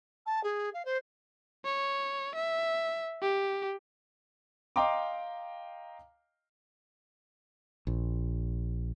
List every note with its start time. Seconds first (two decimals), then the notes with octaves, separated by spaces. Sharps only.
0.26 A5
0.44 G#4
0.74 F5
0.85 C5
1.65 C#5
2.35 E5
3.22 G4
4.76 D#5 F5 G5 A#5 C6 D6
7.87 A#1